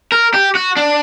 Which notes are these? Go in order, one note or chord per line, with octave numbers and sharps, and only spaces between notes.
A#4
G4
F#4
D4